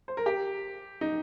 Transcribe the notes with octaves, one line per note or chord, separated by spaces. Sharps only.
C5
A#4
G4
D#4